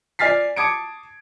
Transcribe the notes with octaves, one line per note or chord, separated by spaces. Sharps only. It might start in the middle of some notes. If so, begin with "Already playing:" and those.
D5 G#5 F6 A6 B6 C7
A5 D6 D#6 G#6 C#7 D7